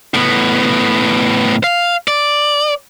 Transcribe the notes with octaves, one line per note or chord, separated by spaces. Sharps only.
A2 B3
F5
D5